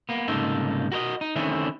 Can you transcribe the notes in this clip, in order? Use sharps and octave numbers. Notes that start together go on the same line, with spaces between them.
A#3 B3
C2 G#2 C#3 A#3 D#4 A4
F#4 A#4 C#5 D#5
D#4
D3 D#3 A3 C4 C#4 E4